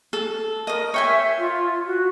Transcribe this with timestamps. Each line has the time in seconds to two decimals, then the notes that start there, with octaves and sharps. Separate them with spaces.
0.13 A4
0.67 A#4 D#5 D#6
0.94 C#5 E5 G5 G#5
1.38 F4
1.86 F#4